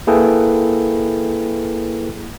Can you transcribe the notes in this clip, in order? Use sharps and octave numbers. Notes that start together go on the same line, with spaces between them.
A#3 E4 G#4 A4 B4 G5